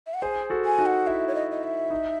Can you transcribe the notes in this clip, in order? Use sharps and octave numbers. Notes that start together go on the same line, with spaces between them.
E5
F#5
G#4 C5 G#5
F#4 A4
G#5
D#4 F#4
F#5
E4 E5
C#5
D#5
D#5
E5
D#4